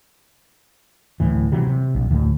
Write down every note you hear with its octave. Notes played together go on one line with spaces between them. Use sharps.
D1 G1 A2 E3
C3 E3 F#3 G3
C3
A#1
D2 A2